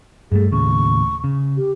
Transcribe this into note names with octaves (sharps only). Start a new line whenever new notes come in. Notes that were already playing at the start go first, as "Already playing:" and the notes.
G2 G3 A3 G#4
D#2 A2 C#3 C#6
C#3
G4